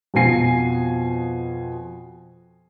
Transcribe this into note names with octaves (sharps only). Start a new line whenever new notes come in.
F2 B2 F3 G#5 C7